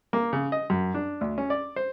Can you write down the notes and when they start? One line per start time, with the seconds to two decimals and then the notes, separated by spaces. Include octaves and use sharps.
0.13 A#3
0.33 C#3
0.52 D#5
0.70 F#2
0.94 D4
1.21 D2
1.38 C#4
1.50 D5
1.76 C5